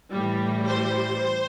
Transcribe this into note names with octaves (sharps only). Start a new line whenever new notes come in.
A2 E3 G3
C5